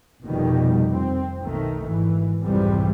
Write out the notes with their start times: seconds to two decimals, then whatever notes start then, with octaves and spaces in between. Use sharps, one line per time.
0.24 F1 B2 D#3 F3 G3 A3
0.87 F2 C4
1.41 B1 D#3 A3
1.86 G#1 E3
2.42 C2 F2 G#2 C3 E3 G3